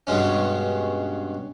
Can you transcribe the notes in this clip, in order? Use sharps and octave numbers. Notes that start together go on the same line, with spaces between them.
G2 B2 G#3 C#4